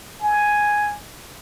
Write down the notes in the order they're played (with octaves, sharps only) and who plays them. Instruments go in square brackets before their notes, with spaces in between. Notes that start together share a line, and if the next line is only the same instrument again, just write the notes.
[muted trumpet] G#5